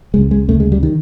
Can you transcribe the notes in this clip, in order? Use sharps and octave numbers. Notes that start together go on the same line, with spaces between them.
C#2 C#3 G#3
G#3
D2 C#3 A3
G#3
G3
D#3